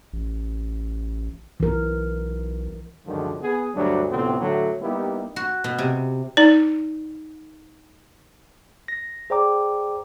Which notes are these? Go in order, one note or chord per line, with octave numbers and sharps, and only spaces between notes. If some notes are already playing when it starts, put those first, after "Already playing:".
A1
B1 E3 A#4
C#2 F#2 D3 D#3 F3
B3 G#4
D2 G2 F#3 G3 D4
D2 A2 C3 F3 B3 C4
A2 D3 F#3 A3
G3 A#3 B3 D#4 E4 G4
F#4
B2
C3
D#4 D5
A#6
G#4 C5 D5 G5 A#5 D6